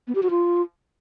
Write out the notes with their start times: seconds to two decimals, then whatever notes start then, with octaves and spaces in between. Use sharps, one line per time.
0.08 B3
0.15 G4
0.23 F#4
0.30 F4